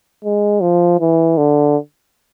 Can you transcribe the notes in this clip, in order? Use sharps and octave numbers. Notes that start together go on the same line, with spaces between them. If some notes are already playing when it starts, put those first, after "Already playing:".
G#3
F3
E3
D3